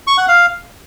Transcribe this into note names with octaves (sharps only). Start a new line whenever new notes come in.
C#6
F#5
F5